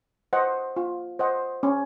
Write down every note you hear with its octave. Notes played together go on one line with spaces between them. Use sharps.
C5 D#5 F#5
F4
C5 D#5 F#5
C#4